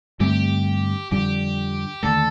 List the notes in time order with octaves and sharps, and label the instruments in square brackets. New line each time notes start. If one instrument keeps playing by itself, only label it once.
[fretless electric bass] G2 D3 A3 C4 [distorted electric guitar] G4
[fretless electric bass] F2 D3 G3 [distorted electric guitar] G4
[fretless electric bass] D#2 D3 A3 [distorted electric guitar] A4